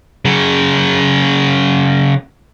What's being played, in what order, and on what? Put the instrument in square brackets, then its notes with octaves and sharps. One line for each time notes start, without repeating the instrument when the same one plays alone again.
[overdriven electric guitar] C#3 F#3